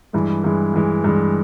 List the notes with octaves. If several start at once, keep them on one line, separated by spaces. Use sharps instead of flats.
G2 E3 G#3
G2 E3 G#3
G2 E3 G#3
G2 E3 G#3